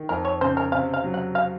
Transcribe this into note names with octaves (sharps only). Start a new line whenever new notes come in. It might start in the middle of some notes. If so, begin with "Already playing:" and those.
Already playing: D#3
F2 A#4
C#5
C#3 C5
A#4
C3 F5
F5
F#3
F#5
F5